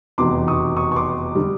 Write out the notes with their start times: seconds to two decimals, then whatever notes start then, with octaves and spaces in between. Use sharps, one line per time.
0.18 F1 E2 B2 C6 D6
0.48 C#6 D#6
0.77 C#6 D#6
0.92 C#6
0.96 C6 D6
1.35 D3 G3